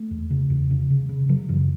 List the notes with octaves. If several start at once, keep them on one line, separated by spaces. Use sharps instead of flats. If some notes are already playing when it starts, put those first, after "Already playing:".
Already playing: A3
E2
C#3
E2
C#3
C#3
C#3
C#3 F#3
F#2 E3